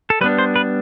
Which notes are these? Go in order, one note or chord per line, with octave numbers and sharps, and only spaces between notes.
A4
G3 B3 D4 B4
C5
B4